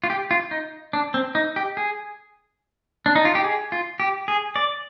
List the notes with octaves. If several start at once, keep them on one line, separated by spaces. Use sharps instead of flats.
F4
G4
F4
D#4
D4
C4
D#4
G4
G#4
D4
D#4
F4
G4
G#4
F4
G4
G#4
D5